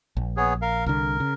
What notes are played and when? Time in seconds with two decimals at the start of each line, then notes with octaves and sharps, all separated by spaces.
0.17 A#1
0.37 B3 G#4 C#5
0.62 A#4 F5
0.86 C2 D3 A#4
1.20 C#3